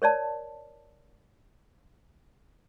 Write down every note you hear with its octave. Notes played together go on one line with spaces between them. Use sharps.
A#4 C#5 D5 A5